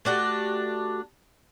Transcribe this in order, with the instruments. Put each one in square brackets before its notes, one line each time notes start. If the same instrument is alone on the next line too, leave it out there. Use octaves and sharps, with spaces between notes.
[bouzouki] A3 D4 F#4 G4